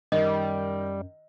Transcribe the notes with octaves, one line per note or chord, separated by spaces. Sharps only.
F#2 D#3 G3 D#5